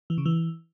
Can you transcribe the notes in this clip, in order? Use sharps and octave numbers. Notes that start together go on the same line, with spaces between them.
E3
C#3
E3